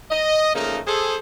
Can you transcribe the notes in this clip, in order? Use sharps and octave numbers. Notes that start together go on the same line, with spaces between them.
D#5
C#3 F3 A3 A#3 D#4
G#4 A4 C5